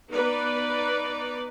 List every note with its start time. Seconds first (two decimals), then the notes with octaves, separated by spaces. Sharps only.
0.11 B3 D#4 B4 D5